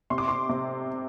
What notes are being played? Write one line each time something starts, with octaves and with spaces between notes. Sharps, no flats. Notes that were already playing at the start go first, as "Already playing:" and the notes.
C3 C6
D6
C6
C3